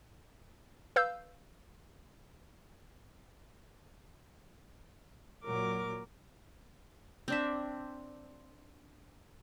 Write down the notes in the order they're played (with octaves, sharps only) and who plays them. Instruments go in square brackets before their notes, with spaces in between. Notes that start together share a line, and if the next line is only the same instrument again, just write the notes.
[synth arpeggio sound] B4 F5 E6 G6
[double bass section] A#2 F#3 [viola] A#4 D6
[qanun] C4 D4 E5